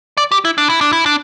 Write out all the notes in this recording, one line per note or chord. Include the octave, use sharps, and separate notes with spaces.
D5
G4
E4
D4
E4
D4
E4
D4